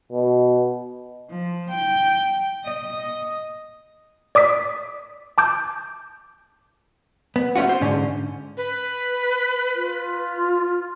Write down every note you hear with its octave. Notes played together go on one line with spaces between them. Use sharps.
B2
F3
G5
D#5
D5 D6 D#6 B6
A5 D6 G6
B3
A3 C#4 F4 F#4
C5
G#2 D3 C#4
B4
F4